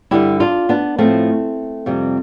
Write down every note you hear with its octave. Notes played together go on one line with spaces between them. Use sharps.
G2 D3 G3 E4 G4
D4 F4
B3 D4
A2 F3 A3 C4
F2 C3 G3